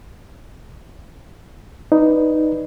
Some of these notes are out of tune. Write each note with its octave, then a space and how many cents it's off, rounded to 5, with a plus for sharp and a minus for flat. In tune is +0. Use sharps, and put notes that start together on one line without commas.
D#4 +0 B4 +0 D5 +0